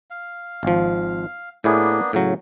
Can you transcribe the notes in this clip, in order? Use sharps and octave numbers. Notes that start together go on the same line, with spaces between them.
F5
G#1 F3
A2 A#3 B3 D4 E4 G#4
A2 C#3 F#3